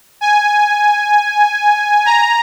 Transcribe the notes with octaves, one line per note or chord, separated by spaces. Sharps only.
G#5
A#5